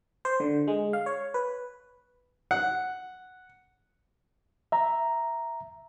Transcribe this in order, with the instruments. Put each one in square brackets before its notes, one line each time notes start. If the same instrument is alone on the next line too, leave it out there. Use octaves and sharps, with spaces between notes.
[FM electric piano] C5
D3
G#3
F5
C#5
B4
[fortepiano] F#5
[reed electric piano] E5 A#5